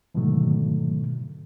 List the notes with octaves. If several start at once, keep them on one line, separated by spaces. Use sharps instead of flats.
G#2 B2 D3 D#3 F#3 A3